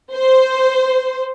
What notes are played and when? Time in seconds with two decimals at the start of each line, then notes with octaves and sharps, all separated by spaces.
0.15 C5